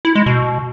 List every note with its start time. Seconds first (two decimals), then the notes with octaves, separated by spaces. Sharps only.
0.05 E4
0.15 G#3
0.26 B2